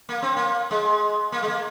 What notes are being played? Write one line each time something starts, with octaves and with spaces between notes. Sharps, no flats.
A#3
C4
A#3
G#3
A#3
G#3
A#3